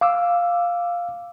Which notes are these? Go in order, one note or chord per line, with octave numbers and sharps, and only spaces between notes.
F5 D6 E6